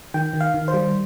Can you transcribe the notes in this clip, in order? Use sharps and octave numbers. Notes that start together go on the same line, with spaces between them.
D#3 G5
D#3
F5
D#3
C5
G3